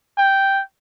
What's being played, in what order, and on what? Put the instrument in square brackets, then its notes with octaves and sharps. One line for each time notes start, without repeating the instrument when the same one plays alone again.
[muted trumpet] G5